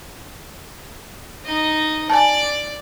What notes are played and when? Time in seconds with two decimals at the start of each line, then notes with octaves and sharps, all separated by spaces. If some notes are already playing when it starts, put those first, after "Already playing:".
1.45 D#4 D#5
2.10 D5 G#5 A5